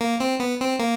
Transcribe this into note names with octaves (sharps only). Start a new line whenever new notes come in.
A#3
C4
B3
C4
A#3